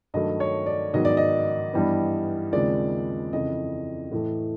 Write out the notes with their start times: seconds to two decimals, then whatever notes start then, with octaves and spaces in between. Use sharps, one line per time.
0.14 G2 D#3 F#3 A3 D#5
0.40 C#5
0.66 D5
0.93 G#2 D#3 F#3 B3 D#5
1.05 D5
1.17 D#5
1.73 G2 E3 G3 B3
2.52 D#2 C#3 F3 G#3 C4 D5
3.32 F2 C#3 E3 D#5
4.12 A2 E3 A3